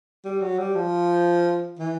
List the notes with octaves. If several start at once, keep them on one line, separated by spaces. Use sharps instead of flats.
G3
F#3
G3
F3
E3